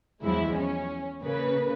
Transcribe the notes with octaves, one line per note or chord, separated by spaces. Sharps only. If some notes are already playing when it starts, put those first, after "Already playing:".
E2 F3 F#3 G#3 E4
C#4
C#3 A#3 B4